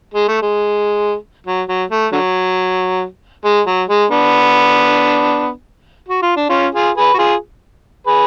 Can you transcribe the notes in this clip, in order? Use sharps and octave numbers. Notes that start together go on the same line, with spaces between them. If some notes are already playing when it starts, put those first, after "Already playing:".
G#3
A3
G#3
F#3
F#3
A3
D3 F#3
G#3
F#3
G#3
B3 D4
F#4
F4
D4
C#4 F4
F4 G#4
G#4 B4
F#4
F4 G#4
G#4 B4